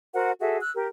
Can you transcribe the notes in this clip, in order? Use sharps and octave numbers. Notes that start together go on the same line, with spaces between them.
F#4 A#4 C5 F#5
F#4 G#4 A4 E5
E6 F#6
G4 A#4